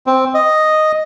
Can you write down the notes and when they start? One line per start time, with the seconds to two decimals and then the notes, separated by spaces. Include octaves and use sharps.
0.07 C4
0.34 D#5